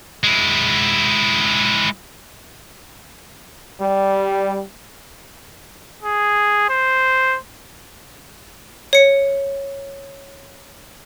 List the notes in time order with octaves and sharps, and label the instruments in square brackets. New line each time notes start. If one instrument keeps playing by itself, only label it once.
[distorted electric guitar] G#3 E4
[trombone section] G3
[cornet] G#4
C5
[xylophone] C#5 C#7